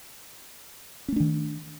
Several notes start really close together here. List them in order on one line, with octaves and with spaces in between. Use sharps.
C#4 A3 D4 D#3